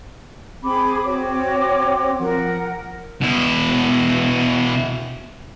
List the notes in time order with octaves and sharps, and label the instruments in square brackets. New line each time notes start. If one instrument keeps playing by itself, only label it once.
[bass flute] C4 [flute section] G#4 B5 D6
[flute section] F#4 C#5 D6
[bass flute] F3 [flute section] A#4 F#5
[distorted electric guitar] B2 E4